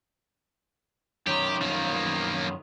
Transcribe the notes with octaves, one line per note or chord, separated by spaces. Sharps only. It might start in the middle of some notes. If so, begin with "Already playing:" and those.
F#2 D#3 G4
F3 A#3